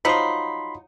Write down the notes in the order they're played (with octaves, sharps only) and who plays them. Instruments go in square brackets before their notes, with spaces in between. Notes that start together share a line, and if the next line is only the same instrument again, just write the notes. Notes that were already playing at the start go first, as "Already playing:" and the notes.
[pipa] F3 F#3 D#4 [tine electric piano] B5 C6